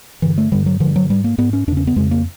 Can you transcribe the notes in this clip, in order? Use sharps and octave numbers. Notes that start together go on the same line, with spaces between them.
G2 D3 E3
A3
G2 D3 G3
F#3
D3 F3
G2
F#3
G#2 G3
A#3
G#2 B3
C#4
E2 C#3 D4
C#4
B3
F2 C#3 G#3
A#3